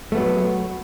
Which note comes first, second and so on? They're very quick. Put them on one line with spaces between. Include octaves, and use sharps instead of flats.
A3 B3 F#3